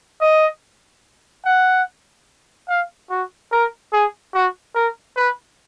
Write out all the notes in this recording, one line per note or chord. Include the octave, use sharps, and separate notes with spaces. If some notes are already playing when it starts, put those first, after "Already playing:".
D#5
F#5
F5
F#4
A#4
G#4
F#4
A#4
B4